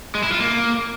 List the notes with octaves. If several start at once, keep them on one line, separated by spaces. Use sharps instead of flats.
G#3
E4
F4
A#3